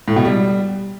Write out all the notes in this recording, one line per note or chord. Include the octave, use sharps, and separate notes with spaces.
A2
B2
G3